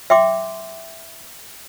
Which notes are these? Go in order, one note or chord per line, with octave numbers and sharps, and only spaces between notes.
E5 G5 C6 D6